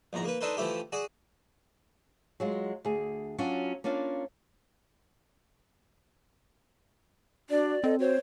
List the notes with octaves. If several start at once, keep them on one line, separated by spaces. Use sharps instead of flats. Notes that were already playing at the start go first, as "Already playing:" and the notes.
A#1 E2 G#2 A#5
A#3 B4
D4 D#4 A4 B4 C5
E3 F3 A3 E4 G4
F#4 G#4 D5
F#3 G#3 F4
D2 G#4
F#3 C#4 D4 F4 F#4
A#3 C#4 D4 F4 F5
D4 F#4 D5
C4 A4 D#5
F#4 C5 C#5